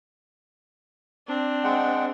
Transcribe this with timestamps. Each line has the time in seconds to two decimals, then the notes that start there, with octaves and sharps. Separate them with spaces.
1.27 C4 D4
1.64 G#3 F#5 G5